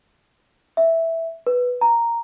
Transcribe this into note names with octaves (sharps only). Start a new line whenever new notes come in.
E5
B4
A#5